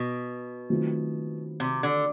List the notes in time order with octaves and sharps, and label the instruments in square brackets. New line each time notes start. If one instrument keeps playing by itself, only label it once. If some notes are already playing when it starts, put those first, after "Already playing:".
Already playing: [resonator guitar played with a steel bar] B2
[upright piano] D#3 F#3 A3 C4 F4
[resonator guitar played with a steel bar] C3
D3